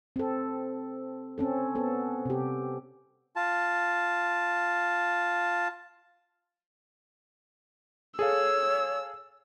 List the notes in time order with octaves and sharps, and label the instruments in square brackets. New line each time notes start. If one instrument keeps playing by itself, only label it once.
[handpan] C4 A4
C4 C#4 A4
B3 A4
C3 G4
[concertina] F4 A5
[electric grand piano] G#4 A4 F5 [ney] C#5 [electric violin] E6